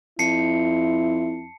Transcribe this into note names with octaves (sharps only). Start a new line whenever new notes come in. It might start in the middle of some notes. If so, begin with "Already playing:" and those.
F2 E4 A5 C7 C#7